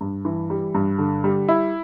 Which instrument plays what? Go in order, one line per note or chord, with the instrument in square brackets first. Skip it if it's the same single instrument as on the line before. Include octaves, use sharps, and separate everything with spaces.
[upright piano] G2
E3
G3
G2
D3
G3
E4